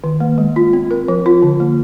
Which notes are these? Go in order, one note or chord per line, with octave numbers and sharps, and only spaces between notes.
D#3
A#3
G#3
F4
C4
A#4
F3
F4
D3
A#3